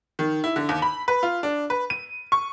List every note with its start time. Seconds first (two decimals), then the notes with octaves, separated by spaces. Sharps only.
0.19 D#3
0.44 E4
0.56 D3
0.69 D#2
0.82 B5
1.08 B4
1.23 F4
1.43 D4
1.70 B4
1.90 D#7
2.32 C#6